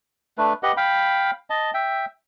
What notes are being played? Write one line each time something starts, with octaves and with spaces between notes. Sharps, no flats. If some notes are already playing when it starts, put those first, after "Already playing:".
A3 D4 B4
G4 B4 D#5 F#5
F5 G5 B5
D#5 A5
E5 G5